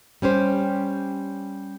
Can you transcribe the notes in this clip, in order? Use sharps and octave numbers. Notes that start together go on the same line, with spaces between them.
G3 C#4 G4 C5